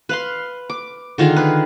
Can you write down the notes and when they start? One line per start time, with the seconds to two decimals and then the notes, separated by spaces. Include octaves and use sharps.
0.09 B4 F5 C6
0.70 D6
1.18 D3 D#3 F4 G#4
1.36 G#4 B4